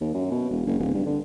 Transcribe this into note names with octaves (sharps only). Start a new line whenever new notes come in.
D#2
F#2
B2
E1
F#1
D1
G2
D3